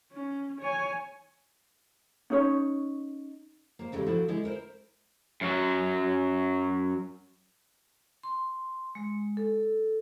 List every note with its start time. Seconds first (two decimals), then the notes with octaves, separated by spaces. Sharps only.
0.12 C#4
0.60 C#5 G#5
2.30 C#4 D#4 C#5
3.79 A#3 C5
3.92 E2 C#3 G#3 A3 G4
4.06 F3 F#3 E4 F#4 A4 C5
4.28 D3 G#3 E4
4.44 E4 A#4 C5
5.41 F#2 F#3
8.23 C6
8.95 G#3
9.37 A4